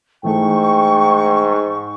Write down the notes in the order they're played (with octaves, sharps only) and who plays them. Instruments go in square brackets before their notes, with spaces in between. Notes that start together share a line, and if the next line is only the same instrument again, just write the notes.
[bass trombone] G#2 [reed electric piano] E3 A3 [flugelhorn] G5 [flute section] C#6